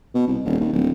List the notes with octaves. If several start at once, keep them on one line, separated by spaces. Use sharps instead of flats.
B2
C2
D#1
D#2
D1